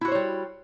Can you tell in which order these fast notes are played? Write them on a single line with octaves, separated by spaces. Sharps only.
E4 F#4 C5 C#5 G3